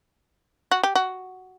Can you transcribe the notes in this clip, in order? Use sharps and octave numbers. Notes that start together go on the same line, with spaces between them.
F#4
G4
F#4